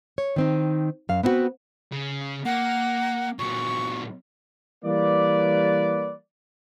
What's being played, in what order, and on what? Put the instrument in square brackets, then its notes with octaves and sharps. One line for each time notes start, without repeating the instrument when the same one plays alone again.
[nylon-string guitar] C#5
D#3 C4 D#4
F#2 F5
B3 C4 E4 F#4 B4
[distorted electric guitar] C#3
[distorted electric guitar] A#3 [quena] F#5
[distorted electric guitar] A#2 F#3 [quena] C#6
[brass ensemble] E3 G3 A#3 B4 D5